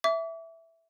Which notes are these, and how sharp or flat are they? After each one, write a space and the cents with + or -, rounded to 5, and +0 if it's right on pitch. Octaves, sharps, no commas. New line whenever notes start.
E5 +0 D6 -35